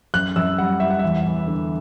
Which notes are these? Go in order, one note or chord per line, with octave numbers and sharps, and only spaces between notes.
F#2 F#6
F#2 E6
G3 F#5
G3 E5
F#5
E2 E5
E2
D3